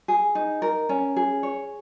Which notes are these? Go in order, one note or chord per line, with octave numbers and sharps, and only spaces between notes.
G#4
D#4
A#4
C#4
G#4
C#5